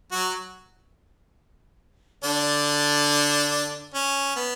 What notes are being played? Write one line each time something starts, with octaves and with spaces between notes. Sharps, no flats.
F#3 F#4
D3 D4
C#4
B3